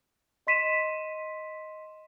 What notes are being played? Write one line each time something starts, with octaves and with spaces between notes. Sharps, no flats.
D#5 C6 B6 D#7 E7